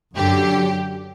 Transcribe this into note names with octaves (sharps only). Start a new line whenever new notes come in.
F#2 D3 F#3 G4